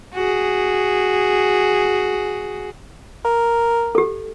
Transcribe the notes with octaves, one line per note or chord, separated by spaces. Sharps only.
F#4 G#4
A#4
G4 A4